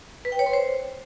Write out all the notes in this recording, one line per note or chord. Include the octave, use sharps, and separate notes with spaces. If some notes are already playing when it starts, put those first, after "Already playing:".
B4
G5
C#5
C6
C5